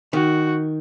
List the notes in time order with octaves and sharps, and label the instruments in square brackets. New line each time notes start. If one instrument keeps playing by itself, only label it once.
[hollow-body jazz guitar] D#3 [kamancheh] F#4